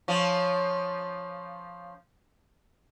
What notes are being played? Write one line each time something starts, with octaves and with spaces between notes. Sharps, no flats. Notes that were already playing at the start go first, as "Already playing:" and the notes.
F3 C#4